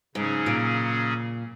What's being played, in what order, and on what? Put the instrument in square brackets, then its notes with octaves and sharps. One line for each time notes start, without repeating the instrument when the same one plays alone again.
[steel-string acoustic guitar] G#2 [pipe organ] C#3 F#3 C#4 G#4
[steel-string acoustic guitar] A#2